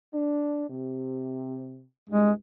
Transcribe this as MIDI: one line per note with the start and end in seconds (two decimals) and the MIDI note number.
0.14 0.63 62
0.70 1.84 48
2.09 2.32 36
2.09 2.32 43
2.09 2.31 56